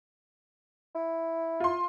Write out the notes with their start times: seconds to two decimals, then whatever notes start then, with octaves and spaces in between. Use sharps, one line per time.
0.95 E4
1.60 F4 C6